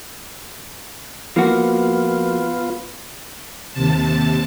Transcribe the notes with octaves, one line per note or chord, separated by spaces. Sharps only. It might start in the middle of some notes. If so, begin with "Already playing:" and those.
F3 A#3 B3 F4 F#4
D#2 C3 A5